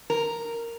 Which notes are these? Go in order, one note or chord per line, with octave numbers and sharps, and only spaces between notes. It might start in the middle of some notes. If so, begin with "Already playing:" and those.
A#4